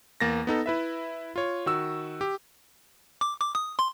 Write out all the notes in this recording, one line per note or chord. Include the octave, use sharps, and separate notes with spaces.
E2 A#3 A6 A#6
B3 D#4 A4
E4 B4 E5
F4 C#5
D#3 F#4 E6
G4
D6
D6
D#6
C6